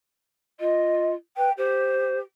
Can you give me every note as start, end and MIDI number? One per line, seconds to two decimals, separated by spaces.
0.60 1.14 65
0.60 1.11 75
1.37 1.50 71
1.37 1.52 79
1.57 2.22 67
1.57 2.19 72